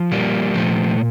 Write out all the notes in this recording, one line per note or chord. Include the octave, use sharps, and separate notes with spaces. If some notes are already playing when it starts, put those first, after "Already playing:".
Already playing: F3
A#2 G3 A#3
A#2 F3 A3